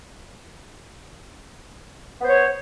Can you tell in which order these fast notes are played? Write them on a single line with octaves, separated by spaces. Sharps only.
B3 C5 C#5